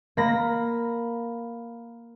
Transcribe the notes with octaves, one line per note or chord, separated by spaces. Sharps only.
A#3 B5 A#6